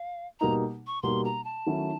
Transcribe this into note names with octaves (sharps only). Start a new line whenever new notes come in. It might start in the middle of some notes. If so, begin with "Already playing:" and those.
Already playing: F5
B2 G3 A#3 D#4 A#5
C#6
B2 G3 A#3 D#4 C6
A#5
A5
D#3 F#3 A3 C#4 E4